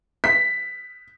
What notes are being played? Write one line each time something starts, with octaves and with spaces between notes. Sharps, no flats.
B6